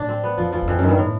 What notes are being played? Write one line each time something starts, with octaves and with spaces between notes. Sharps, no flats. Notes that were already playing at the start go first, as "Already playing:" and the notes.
Already playing: A2 D4
C4
B3
F2 F3
E2 F3
E2
F2 E3
F#2 D#3
G2
A2